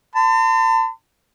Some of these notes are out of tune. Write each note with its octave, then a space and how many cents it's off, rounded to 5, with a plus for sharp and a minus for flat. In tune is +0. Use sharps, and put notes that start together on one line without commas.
A5 +40 C6 -45